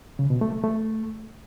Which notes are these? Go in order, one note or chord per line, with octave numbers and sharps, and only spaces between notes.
C#3
B2
A3
A3
A3